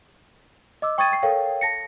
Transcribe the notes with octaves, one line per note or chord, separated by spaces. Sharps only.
D#5 D6 E6
G5 C#6 D#6 G#6 A6 D#7
G5 C#6 C7
A4 A#4 C#5 F5 G5
A5 A#6 C#7